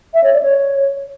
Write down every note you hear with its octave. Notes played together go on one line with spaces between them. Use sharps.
E5
C#5
D5
C#5